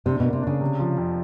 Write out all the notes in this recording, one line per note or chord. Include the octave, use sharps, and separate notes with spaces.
C3 D4
B2 A#3
C3
C#3 D4
C3
F3
F2